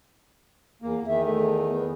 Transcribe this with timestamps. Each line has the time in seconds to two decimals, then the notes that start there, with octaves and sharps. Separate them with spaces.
0.82 E2 A#3
1.06 E2 D#3 E5
1.26 A3
1.69 B3